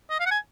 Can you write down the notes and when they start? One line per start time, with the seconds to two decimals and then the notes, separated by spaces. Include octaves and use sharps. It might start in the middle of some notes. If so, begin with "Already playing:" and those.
0.10 D#5
0.20 F5
0.26 F#5
0.31 G#5